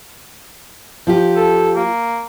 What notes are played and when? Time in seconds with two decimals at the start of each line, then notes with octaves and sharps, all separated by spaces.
1.07 F3 F4 G4
1.36 A4
1.76 A#3